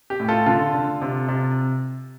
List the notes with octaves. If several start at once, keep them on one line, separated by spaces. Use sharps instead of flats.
G4
A2
F4 A4
D3 F4 A4
D3
C3
C3